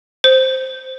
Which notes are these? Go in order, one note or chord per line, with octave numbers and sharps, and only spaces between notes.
C5